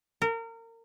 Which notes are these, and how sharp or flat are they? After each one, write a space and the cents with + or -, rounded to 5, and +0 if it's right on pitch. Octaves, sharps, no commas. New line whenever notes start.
A#4 -30